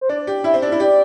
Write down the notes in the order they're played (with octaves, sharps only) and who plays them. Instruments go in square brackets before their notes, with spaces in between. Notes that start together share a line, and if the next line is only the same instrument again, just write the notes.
[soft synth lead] C5
[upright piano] D4 [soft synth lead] D5
[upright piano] G4
[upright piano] E4 [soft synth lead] E5
[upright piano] C4
D4
E4
[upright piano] G4 [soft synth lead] D5